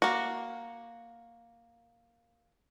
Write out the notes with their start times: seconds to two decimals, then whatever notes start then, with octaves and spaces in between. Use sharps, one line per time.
0.02 A#3 F#4